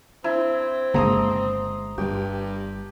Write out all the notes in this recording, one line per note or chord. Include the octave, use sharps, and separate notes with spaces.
C4 D4 E4
G1 C#3 G#3 A#3 D4 A#5 C6 D#6
G1 G2 G3 G4